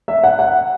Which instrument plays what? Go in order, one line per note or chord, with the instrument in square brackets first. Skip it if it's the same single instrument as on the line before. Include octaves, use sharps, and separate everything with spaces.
[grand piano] E5
F#5
F#5